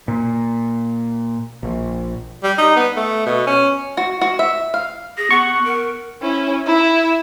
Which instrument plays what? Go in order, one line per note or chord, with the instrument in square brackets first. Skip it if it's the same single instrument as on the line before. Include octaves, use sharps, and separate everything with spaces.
[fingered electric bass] A#2
A#1
[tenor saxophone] G3
D#4
B3
A3
B2
C#4
[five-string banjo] F#4
F#4
E5
F5
[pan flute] G#4 [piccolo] A#6
[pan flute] B3 [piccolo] F#5 [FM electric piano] C#6
[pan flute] A#4
[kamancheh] C#4 E4
E4 E5